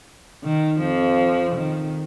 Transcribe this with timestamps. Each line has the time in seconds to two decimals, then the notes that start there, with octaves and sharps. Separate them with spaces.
0.44 D#3
0.80 F2 F3
1.56 D#3